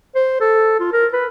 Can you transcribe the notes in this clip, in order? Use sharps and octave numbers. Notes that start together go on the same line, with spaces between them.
C5
A4
F4
A#4
B4